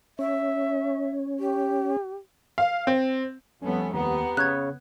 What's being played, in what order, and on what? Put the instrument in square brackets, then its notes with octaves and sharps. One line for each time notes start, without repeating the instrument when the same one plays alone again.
[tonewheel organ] C#4 [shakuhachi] E5
[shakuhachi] G4
[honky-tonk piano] F5
C4
[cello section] F2 G3 B3 [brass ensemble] A3 C#4
[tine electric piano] D#2 [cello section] B3 [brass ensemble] G4 F#5 A#5
[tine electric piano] C#3 C#5 [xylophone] F#6 G#6